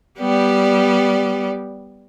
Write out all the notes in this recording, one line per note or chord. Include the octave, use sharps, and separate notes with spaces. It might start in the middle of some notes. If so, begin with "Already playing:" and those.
G3 B3 G4 D5